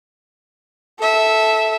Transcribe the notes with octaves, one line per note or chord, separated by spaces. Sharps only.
A4 E5